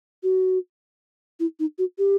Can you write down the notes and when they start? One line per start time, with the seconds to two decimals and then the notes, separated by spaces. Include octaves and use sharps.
0.23 F#4
1.40 E4
1.59 D#4
1.78 F#4
1.98 G4